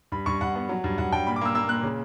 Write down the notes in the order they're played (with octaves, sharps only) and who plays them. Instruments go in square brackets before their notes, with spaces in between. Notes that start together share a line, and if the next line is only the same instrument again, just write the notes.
[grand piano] G2 B5
G2 C#6
G2 F#5
B3
F#3
G2
G2 F#5
G2 G5
A#2 B5
D6
A#3 E6
A#3 E6
A#2 F#6
C#3